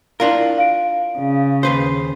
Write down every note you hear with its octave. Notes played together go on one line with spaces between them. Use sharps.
D4 E4 F4 A#4 D5 F5
F5 D7
C#3
D#2 B4 C5